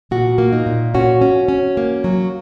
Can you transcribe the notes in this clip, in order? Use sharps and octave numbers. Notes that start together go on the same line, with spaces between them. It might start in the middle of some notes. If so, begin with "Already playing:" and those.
A#2 F#4
A#3
D#4
A#2
C#4 F#4
C#4
C#4
A#3
F#3